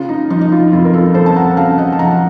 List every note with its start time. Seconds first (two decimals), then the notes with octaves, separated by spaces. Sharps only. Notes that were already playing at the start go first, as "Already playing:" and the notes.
Already playing: C#3 F4
0.09 D#4
0.30 F3 D#4
0.41 D#4
0.52 F4
0.72 F2 F4
0.85 A#4
0.93 F4 A4
1.14 F2 A4 C5
1.26 A5
1.36 F#5 A#5
1.57 C#3 F5 A5
1.78 D#5 F#5
1.92 A5
1.99 F3 F#5 A#5